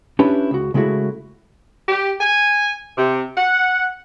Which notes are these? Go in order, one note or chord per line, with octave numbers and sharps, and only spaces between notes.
C#4 D4 E4 G4 B4
C#2 F#4
C#3 G#3 A3 E4 F#4
G4
G#5
C3
F#5